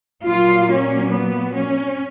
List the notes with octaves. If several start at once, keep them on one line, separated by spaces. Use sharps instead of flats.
A#2 F#3 A#3 F4
C#4
B3
C#4